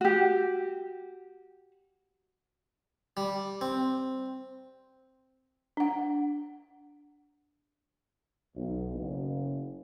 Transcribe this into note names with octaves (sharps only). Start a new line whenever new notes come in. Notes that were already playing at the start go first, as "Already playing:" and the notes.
F#4 G4
G3
C4
D4 F#5
B1
F#1